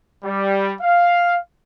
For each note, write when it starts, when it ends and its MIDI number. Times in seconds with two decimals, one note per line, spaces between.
0.24 0.74 55
0.82 1.37 77